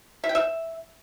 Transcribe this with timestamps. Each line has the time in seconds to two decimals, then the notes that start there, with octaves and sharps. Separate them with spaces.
0.24 E5
0.29 G5
0.35 E5